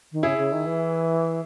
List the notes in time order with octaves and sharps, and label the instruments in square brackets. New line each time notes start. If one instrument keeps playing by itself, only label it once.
[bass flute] D#3
[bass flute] C#3 [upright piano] E4 G#4
[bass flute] C#3
D#3
E3